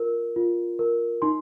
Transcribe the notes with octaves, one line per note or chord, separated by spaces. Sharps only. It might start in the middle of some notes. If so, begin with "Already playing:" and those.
Already playing: F4 A#4
F4
A#4
D#4 C6